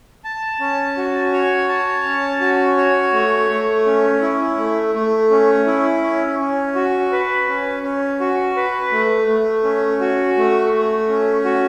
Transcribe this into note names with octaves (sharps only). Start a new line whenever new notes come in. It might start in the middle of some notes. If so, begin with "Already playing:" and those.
A5
C#4
F#4
C#5
A5
C#4
F#4
C#5
A3
A3
C#4
E4
A3
A3
C#4
E4
C#4
C#4
F#4
B4
C#4
C#4
F#4
B4
A3
A3
C#4
F#4
A3
A3
C#4
F#4